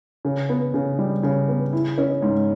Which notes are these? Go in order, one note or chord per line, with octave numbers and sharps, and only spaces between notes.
C#3
B3
C#3
G3
C#3
B3
E4
C#4
G#2